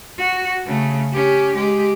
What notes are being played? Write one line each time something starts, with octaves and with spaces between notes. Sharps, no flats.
F#4
C#3 A3
C#4 G4
G#3 G4